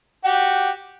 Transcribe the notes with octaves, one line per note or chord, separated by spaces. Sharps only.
F#4 G4